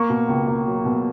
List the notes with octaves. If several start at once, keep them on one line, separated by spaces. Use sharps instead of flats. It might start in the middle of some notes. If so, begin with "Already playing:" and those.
Already playing: A#3 C#6
B2
C#2
A#3
F#3
B2